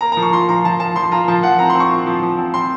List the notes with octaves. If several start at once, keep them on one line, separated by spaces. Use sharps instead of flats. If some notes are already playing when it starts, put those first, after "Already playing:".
A#3 A#5
A#5
F3
C#6
F4 C6
F3 A#5
F3 A5
F3 A5
F3 C6
F4 A#5
F3 A5
F3 F#5
C4 A#5
C6
C4
C#6
F4
F3
F3
C4
C4 C6